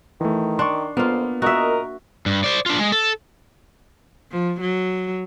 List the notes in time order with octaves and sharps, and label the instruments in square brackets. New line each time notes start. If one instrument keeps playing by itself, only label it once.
[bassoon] D#3 [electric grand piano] E3 A3
[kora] D4 [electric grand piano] C6 C#6
[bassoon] F2 [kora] A#3 F4 [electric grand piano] B3
[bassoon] A#2 [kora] F#4 E5 [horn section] A#4 D#5
[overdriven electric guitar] G2
C5 D5
D4 F4
G#3
A4
[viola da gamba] F3
F#3